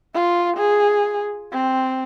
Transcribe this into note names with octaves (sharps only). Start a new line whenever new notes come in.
F4
G#4
C4